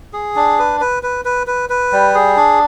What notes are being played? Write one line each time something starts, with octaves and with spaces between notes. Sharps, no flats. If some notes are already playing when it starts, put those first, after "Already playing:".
G#4
D4
B4
B4
B4
B4
B4
B4
G3
G#4
D4